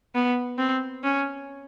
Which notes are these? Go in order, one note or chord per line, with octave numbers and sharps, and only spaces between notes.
B3
C4
C#4